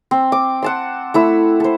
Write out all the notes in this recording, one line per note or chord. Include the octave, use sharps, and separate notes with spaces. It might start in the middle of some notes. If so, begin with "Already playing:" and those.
C4
D6
F#5 A5 C6
A3 E4 E6
A4 C5